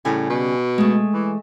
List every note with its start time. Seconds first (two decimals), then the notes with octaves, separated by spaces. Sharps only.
0.05 A2 C#3 G3 G#5
0.30 B2
0.78 G#3 A3
1.14 E3